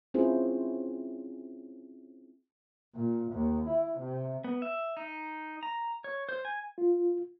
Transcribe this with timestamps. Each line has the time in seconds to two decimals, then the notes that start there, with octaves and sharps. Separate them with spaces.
0.14 C4 C#4 E4 F4 G#4 C5
2.94 A#2
3.32 D#2
3.68 E4
3.99 C3
4.44 B3
4.62 E5
4.97 D#4
5.63 A#5
6.04 C#5
6.29 C5
6.45 G#5
6.78 F4